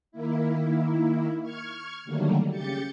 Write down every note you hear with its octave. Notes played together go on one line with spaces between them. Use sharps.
D#3 A#3 E4
C#6 F6 G#6
D3 D#3 F#3 G3 A3 A#3
C#3 G4 G6 A6 C#7